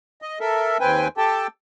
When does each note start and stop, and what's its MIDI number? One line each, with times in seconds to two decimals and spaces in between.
0.22 0.39 75
0.40 0.77 69
0.40 0.77 70
0.40 0.77 76
0.80 1.08 39
0.80 1.08 60
0.80 1.08 71
0.80 1.08 79
0.80 1.08 80
1.17 1.47 67
1.17 1.47 69
1.17 1.47 79
1.17 1.47 81